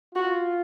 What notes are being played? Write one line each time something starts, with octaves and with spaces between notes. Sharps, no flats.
F4 F#4